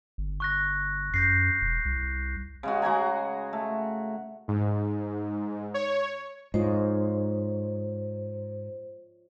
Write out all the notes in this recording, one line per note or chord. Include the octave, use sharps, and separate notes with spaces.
G1
C#6 F#6 A#6
F#2 G6 A#6 C7
E1
C2
C#3 G#3 F#4
G#3 F#4 G#5 A#5
A3
G#2
C#5
G#2 F4 C5 C#5 D#5